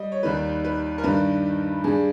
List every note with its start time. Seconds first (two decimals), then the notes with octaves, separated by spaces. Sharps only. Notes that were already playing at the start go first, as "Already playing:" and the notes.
Already playing: G3 D#5
0.12 C#5
0.23 D#2 D#3 G3 B4
0.64 B4
0.98 A#4
1.03 G2 D#3 G3 B4
1.84 G2 G3 G#4